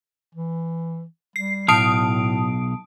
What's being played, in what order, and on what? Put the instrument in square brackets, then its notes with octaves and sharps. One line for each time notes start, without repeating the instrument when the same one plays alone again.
[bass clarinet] E3
[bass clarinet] G3 [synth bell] C7
[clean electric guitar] B1 F5 [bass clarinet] A2 [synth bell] A5 D#6 D7